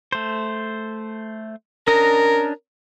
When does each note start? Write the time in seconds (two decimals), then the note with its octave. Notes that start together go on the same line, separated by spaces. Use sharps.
0.12 A3 C5
1.87 C#4 D4 A#4 D#5